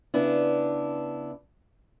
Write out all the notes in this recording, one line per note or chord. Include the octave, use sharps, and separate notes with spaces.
C#3 B3 D4 E4